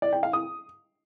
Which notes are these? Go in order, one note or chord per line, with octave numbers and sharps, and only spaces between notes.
D5
G5
F5
D#6